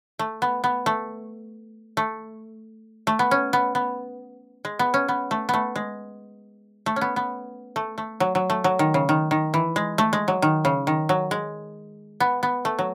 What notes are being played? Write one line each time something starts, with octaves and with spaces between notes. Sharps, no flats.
A3
B3
B3
A3
A3
A3
B3
C#4
B3
B3
G#3
B3
C#4
B3
A3
A3 B3
G#3
A3
C#4
B3
B3
A3
A3
F#3
F#3
A3
F#3
D#3
C#3
D#3
D#3
E3
G#3
A3
G#3
F#3
D#3
C#3
D#3
F#3
G#3
B3
B3
A3
F#3